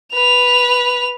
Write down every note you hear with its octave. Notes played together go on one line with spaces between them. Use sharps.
B4 F7